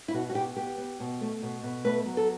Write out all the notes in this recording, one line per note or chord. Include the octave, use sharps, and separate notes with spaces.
E4
B2 F#4
F#4
B2 G4
B3 G4
B3
B2
A3
B2
B2
A3 B4
F#3
A4